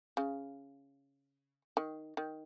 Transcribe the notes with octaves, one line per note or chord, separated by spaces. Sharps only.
C#3
D#3
D#3